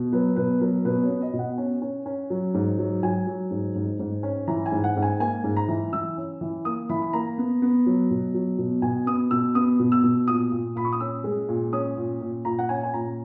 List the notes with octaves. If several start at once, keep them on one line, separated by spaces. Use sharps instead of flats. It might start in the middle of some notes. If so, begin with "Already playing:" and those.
Already playing: B2
F#3 B4
B2 B4
F#3 A#4
B2 B4
C#5
B3
D#5
B2
F#5
C#4
C#4
C#4
F#3
G#2
F#3
F#3 G#5
F#3
G#2
G#2
G#2
C#4
E3 A#5
G#5
G#2
F#5
G#2
G#5
A#3 G#5
G#2
A#5
E3
E3 E6
C#4
E3
A#3 D#6
E3 B5
B5
A#3 A#5
B3
B3
F#3
B2
F#3
B2
B2 G#5
B3 D#6
B2 E6
B3 D#6
B2
E6
B2
A#2 D#6
A#2
A#2 B5
C#6
D#6
C#4 E6
G#3
A#2
C#4 D#6
A#2
A#2
A#2 A#5
F#5
C#4 G#5
G#5
A#2 A#5